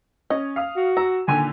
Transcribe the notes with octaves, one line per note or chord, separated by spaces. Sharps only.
C#4 D#5
F5 D#6
F#4
A#5 E6
A#2 D3 D#3 G#5